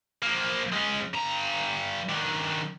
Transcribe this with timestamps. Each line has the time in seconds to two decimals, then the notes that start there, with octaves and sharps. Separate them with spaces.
0.23 F3 A#3
0.73 G#3 C#4
1.14 G2 A#5
2.09 D#3 D4